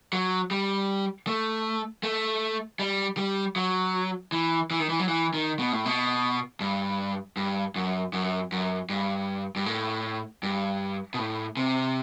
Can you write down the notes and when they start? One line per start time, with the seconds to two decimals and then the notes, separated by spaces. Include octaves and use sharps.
0.13 F#3
0.51 G3
1.27 A3
2.03 A3
2.79 G3
3.17 G3
3.56 F#3
4.32 E3
4.71 E3
4.80 D#3
4.89 E3
5.00 F#3
5.08 E3
5.34 D#3
5.59 B2
5.72 A2
5.85 B2
6.60 G2
7.37 G2
7.76 F#2
8.13 F#2
8.52 F#2
8.90 G2
9.56 G2
9.66 A2
10.43 G2
11.14 B2
11.19 A2
11.57 C3